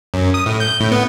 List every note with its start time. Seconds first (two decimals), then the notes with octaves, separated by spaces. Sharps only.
0.14 F#2
0.34 D#6
0.46 A2
0.60 G6
0.80 A2
0.92 B3